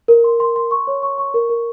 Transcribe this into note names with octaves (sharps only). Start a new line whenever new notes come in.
A#4
C6
C6
C6
C#6
C#5
C#6
C#6
A#4
A#4